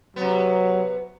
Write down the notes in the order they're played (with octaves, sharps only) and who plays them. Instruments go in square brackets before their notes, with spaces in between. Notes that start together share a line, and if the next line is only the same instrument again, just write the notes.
[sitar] C3 B3 [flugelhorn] F#3